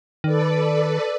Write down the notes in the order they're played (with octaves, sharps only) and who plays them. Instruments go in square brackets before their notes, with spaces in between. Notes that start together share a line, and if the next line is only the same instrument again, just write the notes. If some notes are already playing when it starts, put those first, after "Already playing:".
[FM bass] D#3 [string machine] A4 B4 D5